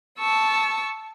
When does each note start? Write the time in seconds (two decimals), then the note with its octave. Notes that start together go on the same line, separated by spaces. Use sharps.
0.18 A5 C#6 E6